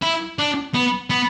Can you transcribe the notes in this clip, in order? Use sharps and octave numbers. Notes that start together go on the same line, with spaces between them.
E4
D4
B3
B3